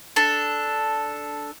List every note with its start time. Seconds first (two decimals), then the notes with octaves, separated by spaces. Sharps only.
0.16 D4 A4